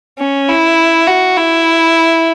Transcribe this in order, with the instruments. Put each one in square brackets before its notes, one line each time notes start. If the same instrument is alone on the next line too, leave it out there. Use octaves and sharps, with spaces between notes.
[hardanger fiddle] C#4
E4
F#4
E4